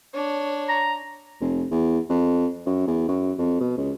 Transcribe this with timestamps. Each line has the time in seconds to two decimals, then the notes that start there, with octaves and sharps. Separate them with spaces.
0.14 D4 C#5
0.69 A#5
1.40 F1
1.71 E2
2.10 F2
2.66 F#2
2.87 E2
3.08 F#2
3.38 F2
3.60 B2
3.77 C#2